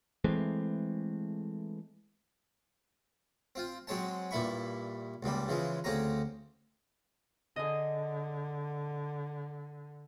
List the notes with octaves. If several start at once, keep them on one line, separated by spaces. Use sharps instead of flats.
E3 G#3 A3 C4
C4 F4
F#3 G#3 C4 C#5 A5
G2 A#2 E4 B5 C#6
C#2 G#2 G3 A#3
C#3 E3 F3 G#3
D2 C#3 C4 C#4 A#5
D3 G#4 D#5